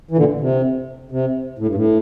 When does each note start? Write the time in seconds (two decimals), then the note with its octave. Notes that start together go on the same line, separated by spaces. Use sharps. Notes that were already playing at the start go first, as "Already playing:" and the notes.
0.11 E3
0.17 A#2 D3
0.41 C3
1.11 C3
1.59 A2
1.67 G2
1.75 A2